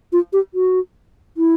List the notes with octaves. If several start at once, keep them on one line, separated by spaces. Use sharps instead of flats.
F4
G4
F#4
E4